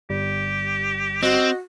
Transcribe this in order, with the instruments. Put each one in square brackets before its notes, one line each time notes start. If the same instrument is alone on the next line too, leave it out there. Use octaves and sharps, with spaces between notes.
[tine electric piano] G1 G3 [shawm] G4
[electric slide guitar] C4 [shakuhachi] F#4 [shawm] D#5